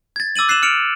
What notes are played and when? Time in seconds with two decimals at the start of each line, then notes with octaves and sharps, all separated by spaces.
0.16 G#6 A6
0.36 D6 E6 A6 D#7 F#7
0.49 F#6 C7 D#7 E7 F#7
0.63 F6 C#7 D7 F7